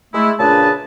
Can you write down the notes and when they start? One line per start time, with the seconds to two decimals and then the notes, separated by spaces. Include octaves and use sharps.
0.14 G#3 A3 E4
0.39 A#2 C#3 D4 G#4 B4 A5